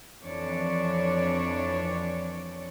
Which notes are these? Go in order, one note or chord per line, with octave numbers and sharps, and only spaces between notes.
F2 E3 D4 C#5 D5